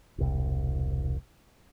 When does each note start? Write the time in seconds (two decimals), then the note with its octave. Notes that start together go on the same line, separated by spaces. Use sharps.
0.18 E1 C2